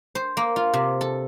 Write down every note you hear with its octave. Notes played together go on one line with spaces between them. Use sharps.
C5
A#3
F4
C3
A4